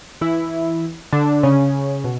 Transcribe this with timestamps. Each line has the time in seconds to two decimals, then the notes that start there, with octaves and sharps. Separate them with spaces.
0.21 E3 E4
1.13 D3 D4
1.43 C#3 C#4
2.04 B2